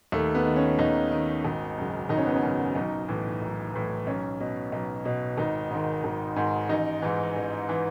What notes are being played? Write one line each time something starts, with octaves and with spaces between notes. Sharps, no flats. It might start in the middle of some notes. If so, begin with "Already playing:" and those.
D#2 A3
B3
D#3
C#4
D#2 D#4
D#3
G#1
F#2 C#3
G#1 D#4
C#4
B3
C#4
F#2 C#3
B1 D#4
A2 E3
B1
A2 E3
B1 C#4
B2
B1
B2
G#1 D#4
G#2 D#3
G#1
G#2 D#3
A1 D#4
G#2 E3
A1
E3